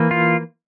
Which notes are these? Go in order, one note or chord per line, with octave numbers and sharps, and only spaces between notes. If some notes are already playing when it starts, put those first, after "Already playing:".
Already playing: E3 A#3
F4